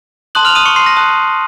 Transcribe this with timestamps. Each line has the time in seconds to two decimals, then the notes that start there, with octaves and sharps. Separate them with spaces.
0.35 A5 C6 D#6 F#6 F#7
0.45 F6 F7
0.55 D#6 D#7
0.66 C#6 C#7
0.76 C6 C7
0.86 A#6
0.96 A5 D#6 F#6